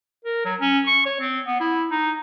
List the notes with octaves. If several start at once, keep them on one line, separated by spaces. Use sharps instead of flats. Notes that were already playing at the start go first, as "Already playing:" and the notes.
A#4
F#3
C#4
C#6
C#5
C4
B3
E4
D#4